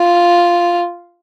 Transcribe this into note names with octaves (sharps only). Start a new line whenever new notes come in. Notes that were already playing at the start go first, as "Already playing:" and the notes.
Already playing: F4